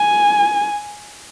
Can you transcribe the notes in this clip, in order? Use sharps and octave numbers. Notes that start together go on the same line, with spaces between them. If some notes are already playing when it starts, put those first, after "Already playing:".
Already playing: G#5